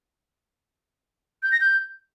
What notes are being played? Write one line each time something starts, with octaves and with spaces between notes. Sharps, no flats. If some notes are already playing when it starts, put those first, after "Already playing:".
G6
A#6
G6